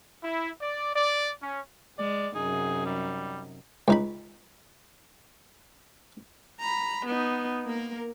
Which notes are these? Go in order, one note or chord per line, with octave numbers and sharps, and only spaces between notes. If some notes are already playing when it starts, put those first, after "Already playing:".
E4
D5
D5
C#4
G#3 D5
F#2 C3 D#4 G#4
G3
C#2 D#4 B5
A#5 B5
B3 D#4
A#3 A#4